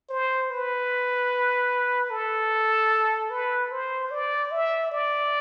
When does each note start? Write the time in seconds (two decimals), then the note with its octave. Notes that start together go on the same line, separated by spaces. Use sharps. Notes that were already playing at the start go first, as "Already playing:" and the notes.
0.09 C5
0.50 B4
2.11 A4
3.30 B4
3.72 C5
4.11 D5
4.52 E5
4.92 D5